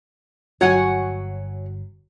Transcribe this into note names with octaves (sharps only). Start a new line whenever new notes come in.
G1 F#3 C#5 F#5 G#5